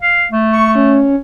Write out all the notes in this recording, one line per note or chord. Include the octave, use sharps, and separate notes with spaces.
F5
A3
C#6
C#4